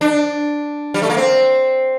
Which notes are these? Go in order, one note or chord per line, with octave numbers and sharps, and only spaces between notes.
D4
G3
A3
A#3
C4